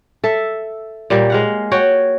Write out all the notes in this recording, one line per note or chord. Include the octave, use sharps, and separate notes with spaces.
A4 E5
A#2 G3 A#3
G#3 F5 F#5
F#4 C#5 G5